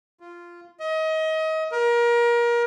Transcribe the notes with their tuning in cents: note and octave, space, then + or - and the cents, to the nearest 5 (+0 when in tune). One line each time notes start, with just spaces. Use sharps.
F4 -10
D#5 +30
A#4 +30